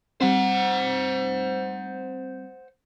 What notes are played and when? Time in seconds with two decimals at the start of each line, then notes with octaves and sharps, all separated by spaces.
0.21 G3 C4 C5 F#5